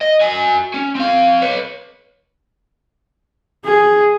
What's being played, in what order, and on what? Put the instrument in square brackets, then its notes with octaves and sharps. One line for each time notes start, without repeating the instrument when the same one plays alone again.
[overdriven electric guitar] D#5
F#4 G#5
C#4
C4 F5
B4 C#5
[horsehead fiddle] G#4